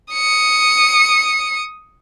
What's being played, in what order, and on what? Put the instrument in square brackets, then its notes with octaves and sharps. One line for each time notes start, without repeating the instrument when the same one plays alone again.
[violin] D#6 C#7